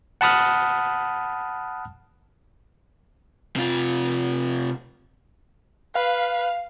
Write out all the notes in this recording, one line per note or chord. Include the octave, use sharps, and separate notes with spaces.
F#5 A5 B5 D#6 F6 F#6
C3 F4
B4 F5